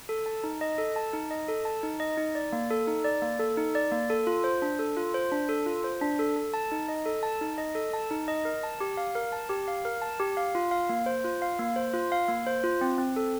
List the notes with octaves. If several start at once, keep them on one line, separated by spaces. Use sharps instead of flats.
A4
A5
D#4
D#5
A4
A5
D#4
D#5
A4
A5
D#4
D#5
D#4
D5
A#3
A4
D#4
D5
A#3
A4
D#4
D5
A#3
A4
F4
C5
D4
A4
F4
C5
D4
A4
F4
C5
D4
A4
A4
A5
D#4
D#5
A4
A5
D#4
D#5
A4
A5
D#4
D#5
A#4
A5
G4
F5
A#4
A5
G4
F5
A#4
A5
G4
F5
F4
F5
A#3
C5
F4
F5
A#3
C5
F4
F5
A#3
C5
F4
C4
C4
A4